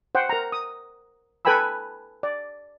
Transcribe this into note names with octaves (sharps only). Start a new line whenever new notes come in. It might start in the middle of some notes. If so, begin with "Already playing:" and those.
C5 F#5 G5
A#4 A#5
D#6
A4 B4 G5 G#5 B5 E6
D5